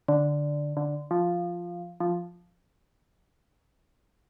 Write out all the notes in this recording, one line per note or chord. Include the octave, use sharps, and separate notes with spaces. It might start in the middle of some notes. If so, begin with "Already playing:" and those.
D3
D3
F3
F3